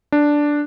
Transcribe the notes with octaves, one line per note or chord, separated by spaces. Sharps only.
D4